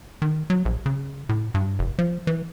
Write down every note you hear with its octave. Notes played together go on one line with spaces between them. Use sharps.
D#3
F#3
A#1
C#3
A2
G2
F1
F3
E3